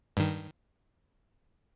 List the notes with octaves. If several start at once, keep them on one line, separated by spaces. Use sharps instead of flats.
G2 D#3